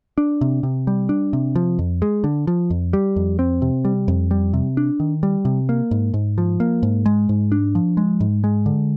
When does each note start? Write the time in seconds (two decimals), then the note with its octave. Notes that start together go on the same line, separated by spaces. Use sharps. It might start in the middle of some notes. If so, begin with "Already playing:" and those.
0.18 D4
0.41 C3
0.63 C3
0.87 G3
1.09 D4
1.33 C3
1.55 F3
1.79 F2
2.02 G#3
2.24 D3
2.47 F3
2.70 F2
2.93 G3
3.16 F2
3.39 C4
3.62 C3
3.85 G3
4.08 F2
4.31 G3
4.53 C3
4.77 D4
5.00 D#3
5.23 G3
5.45 C3
5.69 A#3
5.91 G#2
6.14 G#2
6.38 F3
6.60 A#3
6.83 G#2
7.06 G#3
7.29 G#2
7.52 D4
7.75 F3
7.97 G#3
8.20 G#2
8.44 G#3
8.66 D3